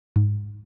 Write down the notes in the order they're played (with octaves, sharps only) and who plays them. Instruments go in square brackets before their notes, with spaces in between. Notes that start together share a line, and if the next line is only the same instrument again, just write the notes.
[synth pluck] G#2